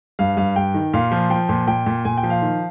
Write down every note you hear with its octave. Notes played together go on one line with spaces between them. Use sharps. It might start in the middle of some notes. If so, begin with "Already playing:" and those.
G2 F5
G2 F5
G2 G5
D#3
A#2 F5
F3
F3 G5
A#2
A#2 G5
A#2
A#2 G#5
G5
F3
F5
D#3